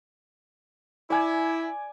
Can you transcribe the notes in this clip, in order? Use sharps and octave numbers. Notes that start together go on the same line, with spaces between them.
E4 D5 G#5